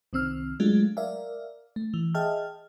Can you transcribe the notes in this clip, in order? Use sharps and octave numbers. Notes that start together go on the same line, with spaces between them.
C2 D#3 C4 E6 F6
F#3 G#3 A3 D4 F4
A#4 D5 E5 F5
A3
E3
G#4 D#5 E5 G5 A5 F6